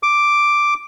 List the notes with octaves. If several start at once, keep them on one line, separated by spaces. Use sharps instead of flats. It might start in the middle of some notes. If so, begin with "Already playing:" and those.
D6